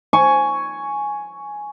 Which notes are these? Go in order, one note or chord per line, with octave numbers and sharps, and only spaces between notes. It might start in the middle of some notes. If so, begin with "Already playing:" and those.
G#5 C#6